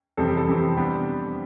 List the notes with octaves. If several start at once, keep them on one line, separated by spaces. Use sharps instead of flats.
F2 C3 E3 G3 C4 A4
G4
A4
F2 C3 E3 G3 C4
C3 G3 B3 D4 G4